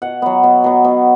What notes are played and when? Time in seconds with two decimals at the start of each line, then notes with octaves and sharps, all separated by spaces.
0.02 B2 F#5
0.22 F#3 B3
0.43 B2
0.64 F#3 B3
0.84 B2